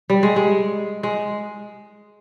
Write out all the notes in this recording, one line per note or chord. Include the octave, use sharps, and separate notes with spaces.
G3
G#3
G#3
G#3